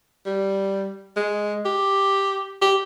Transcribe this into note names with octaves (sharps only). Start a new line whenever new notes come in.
G3
G#3
G4
G4